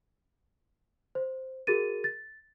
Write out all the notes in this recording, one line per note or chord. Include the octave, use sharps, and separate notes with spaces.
C5
F#4 G#4 A#4 A6 D#7
A6